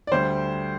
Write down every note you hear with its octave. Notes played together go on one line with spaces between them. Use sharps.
D5
D2 D3 G3 C5